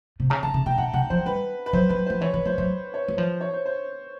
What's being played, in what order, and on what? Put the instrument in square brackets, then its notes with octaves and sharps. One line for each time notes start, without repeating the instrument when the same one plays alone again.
[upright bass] C3
[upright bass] C#3 [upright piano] A#5
[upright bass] D3 [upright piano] A5
[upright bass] C#3
[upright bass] B2 [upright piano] G5
[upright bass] B2 [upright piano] F#5
[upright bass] C3 [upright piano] F#5
[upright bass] F3 [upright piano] C5
[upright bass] G3 [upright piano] B4
[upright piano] B4
[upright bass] F#3 [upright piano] C5
[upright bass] F#3 [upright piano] B4
[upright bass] F3 [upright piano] C5
[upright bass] E3 [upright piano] C#5
[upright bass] E3 [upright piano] B4
[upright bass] F3 [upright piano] C5
[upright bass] F#3 [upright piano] C5
[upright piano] C#5
[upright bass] F#3
[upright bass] F3 [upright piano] C5
[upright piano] C#5
C5
C5